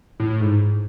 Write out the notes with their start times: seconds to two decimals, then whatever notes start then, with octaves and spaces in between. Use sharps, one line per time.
0.20 A2
0.30 A2
0.41 G#2